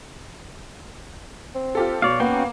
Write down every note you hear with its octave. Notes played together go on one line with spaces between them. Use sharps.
C4
F4 G4 A4
B2 C#5 D5 F5
A#3 B3 C#4 F#4 G5